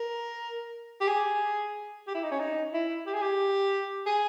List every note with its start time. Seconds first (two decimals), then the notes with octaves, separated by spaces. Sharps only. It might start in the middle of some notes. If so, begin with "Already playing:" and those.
Already playing: A#4
1.01 G4
1.07 G#4
2.07 G4
2.15 E4
2.24 D#4
2.31 C#4
2.39 D#4
2.73 E4
3.06 G4
3.13 G#4
3.22 G4
4.06 G#4